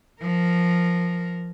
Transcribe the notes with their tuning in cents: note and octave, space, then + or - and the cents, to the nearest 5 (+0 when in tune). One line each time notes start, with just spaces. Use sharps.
F3 +0 A#4 +0